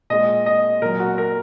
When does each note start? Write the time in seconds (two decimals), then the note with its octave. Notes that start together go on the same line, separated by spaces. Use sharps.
0.10 A#2 G#3 D#5
0.46 D#5
0.82 A#2 F#3 A#4
1.00 F#4
1.18 A#4